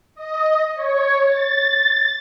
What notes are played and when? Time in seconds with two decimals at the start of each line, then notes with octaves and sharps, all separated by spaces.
0.15 D#5
0.74 C#5
1.27 A6